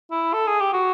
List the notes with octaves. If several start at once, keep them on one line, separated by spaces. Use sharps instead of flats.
E4
A4
G#4
G4
F#4